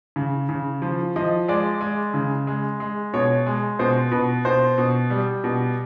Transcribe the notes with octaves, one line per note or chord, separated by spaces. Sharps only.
C#3
C#3
F3
F3 D#5
G#3 D5
G#3
C#3
G#3
G#3
B2 C#5
G#3
B2 C5
B2 B4
B2 C5
B2
G3
B2